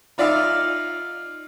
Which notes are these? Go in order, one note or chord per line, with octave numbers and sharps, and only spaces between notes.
D#4 F4 D5 E5 F5